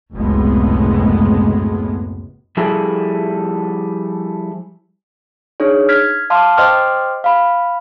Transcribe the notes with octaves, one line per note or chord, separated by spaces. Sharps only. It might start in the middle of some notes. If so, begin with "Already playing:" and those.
F#1 C#2 A2 C3 G#3 B3
F3 G3 E4 G#4 A4
D4 D#4 G#4 C#5
F6 G#6 B6
F5 A5 C6 D6 F6
C5 D#5 G5 C6 D6 F6
F5 B5